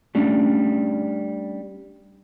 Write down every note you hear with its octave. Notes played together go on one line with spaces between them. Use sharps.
G3 A3 C#4 D4